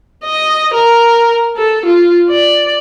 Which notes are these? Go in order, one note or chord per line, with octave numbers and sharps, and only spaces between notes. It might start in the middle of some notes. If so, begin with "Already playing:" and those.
D#5
A#4
A4
F4
D5